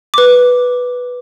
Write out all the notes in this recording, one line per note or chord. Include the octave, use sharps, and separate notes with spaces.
B4 D6